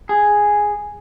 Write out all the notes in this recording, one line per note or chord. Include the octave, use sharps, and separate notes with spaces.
G#4